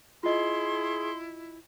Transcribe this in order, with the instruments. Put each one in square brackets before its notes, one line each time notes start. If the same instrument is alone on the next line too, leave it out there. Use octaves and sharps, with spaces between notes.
[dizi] E4 [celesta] F4 D#5 [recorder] G#4 [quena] C6